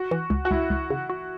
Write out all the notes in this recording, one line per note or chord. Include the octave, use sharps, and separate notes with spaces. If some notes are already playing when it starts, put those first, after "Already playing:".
Already playing: F#4
E3
C#2
F#4
C#2 E4
C#2
C#3
F#4